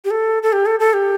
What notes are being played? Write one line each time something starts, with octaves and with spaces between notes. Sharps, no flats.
G4
A4
A4
G4
A4
A4
G4